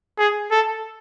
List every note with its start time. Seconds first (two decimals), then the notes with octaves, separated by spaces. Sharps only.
0.18 G#4
0.51 A4